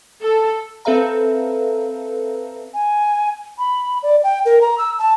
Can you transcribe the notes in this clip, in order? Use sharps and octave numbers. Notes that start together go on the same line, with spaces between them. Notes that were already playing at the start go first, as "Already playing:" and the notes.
A4
C4 A4 B4 E5 F5 A#5
G#5
B5
D5
G5
A#4
A#5
E6
A5